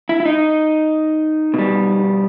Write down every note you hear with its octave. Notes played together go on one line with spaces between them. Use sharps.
E4
E4
D#4
B2 G3